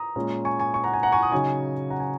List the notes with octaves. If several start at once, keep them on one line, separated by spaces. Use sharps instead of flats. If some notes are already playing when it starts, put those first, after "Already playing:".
Already playing: A#5 D#6
A#2 G#3 C#4
G#5 C#6
G#5 C#6
G#5 C#6
F#5 A#5
G#5
F#5 A#5
G#5 C#6
A#5 D#6
C#3 F#3 D#4 G#5 C#6
F#5 A#5
G#5